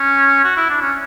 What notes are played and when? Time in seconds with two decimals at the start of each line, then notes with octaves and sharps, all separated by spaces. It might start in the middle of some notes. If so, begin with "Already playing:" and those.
Already playing: C#4
0.44 F#4
0.57 E4
0.70 D4
0.82 C#4